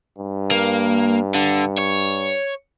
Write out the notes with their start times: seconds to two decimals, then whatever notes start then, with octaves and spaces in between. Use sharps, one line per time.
0.18 G2
0.52 A#3
1.35 D3
1.78 C#5